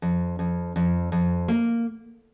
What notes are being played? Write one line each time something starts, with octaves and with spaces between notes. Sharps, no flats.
F2
F2
F2
F2
A#3